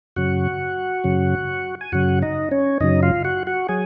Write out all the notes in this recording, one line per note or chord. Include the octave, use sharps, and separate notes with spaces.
F#2 C#3 F#3 F#4 F#5
F#2 C#3 F#3
G#5
F#2 C#3 F#3 F#4 F#5
D#4 D#5
C#4 C#5
F#2 C#3 F#3 D#4 D#5
F4 F5
F#4 F#5
F#4 F#5
F#3 G#4 G#5